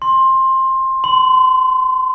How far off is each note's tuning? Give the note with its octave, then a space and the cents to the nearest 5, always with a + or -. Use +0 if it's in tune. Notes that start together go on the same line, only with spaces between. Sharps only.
C6 +15
C6 -30